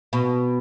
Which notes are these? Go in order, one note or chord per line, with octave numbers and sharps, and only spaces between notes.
B2